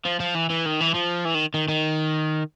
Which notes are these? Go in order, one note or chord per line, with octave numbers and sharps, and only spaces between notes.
F3
F3
E3
E3
D#3
E3
F3
E3
D#3
D#3
D#3